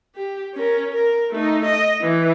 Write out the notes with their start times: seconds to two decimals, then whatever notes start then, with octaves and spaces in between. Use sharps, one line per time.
0.16 G4
0.55 C#4 A#4
0.91 A#4
1.31 A3 D#4
1.65 D#5
2.01 E3